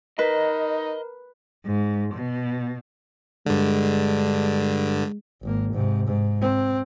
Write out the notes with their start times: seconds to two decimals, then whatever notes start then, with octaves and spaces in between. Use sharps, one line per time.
0.19 D#4 A#4 B4 D#5
1.66 G#2
2.14 B2
3.46 G2 D3 G#3
5.43 G#1 A#3
5.73 G#2 C3
6.07 G#2
6.41 C4